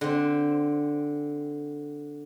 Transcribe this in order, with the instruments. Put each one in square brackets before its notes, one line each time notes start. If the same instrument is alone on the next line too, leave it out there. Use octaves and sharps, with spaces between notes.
[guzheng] D3 C4